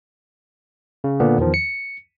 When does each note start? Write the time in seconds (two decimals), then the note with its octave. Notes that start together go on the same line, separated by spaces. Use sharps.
1.04 C#3
1.20 A#2 D3 A#3 B3
1.38 E2 D#3 F3
1.54 C#7